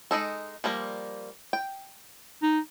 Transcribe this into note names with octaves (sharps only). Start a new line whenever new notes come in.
G#3 D#4 A4
F3 G3 A#3
G5
D#4